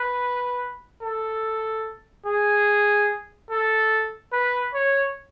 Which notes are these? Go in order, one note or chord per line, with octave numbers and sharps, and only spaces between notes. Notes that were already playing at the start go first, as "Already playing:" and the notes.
Already playing: B4
A4
G#4
A4
B4
C#5